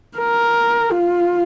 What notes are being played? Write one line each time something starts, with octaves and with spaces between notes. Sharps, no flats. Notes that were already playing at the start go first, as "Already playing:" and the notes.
A#4
F4